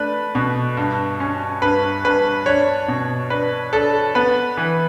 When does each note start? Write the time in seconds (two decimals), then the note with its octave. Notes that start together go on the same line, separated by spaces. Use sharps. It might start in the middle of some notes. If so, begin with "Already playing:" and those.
Already playing: A3 D4 B4
0.35 B2
0.77 G2
1.20 C#4
1.62 G2 B4
2.05 G2 B4
2.46 D4 C#5
2.88 B2
3.30 D4 B4
3.73 D4 A4
4.15 B3 B4
4.57 E3